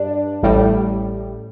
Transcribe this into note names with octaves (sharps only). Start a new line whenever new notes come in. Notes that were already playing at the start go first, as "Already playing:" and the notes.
Already playing: G2 D4
A1 A2 G3